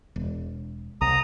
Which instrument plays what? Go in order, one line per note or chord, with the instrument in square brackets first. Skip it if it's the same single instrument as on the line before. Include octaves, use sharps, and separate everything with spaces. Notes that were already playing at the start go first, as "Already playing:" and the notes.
[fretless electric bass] E1
[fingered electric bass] C2 [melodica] A#5 D#6